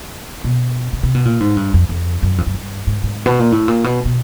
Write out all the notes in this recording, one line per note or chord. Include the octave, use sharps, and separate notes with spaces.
B2
C3
C3
B2
A#2
G#2
G2
F2
F2
F#2
F2
F#2
G2
G#2
G#2
B2
A#2
A2
A#2
B2
B2